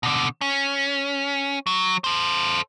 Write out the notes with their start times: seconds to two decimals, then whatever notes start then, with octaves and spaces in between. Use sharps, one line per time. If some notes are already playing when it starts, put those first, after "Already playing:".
0.03 B2 D3
0.41 C#4
1.67 F#3
2.04 A4 C5